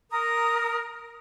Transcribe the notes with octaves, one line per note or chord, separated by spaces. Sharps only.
A#4 D#6